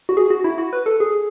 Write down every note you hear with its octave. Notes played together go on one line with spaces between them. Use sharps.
F#4
G#4
F#4
E4
F#4
B4
A4
G#4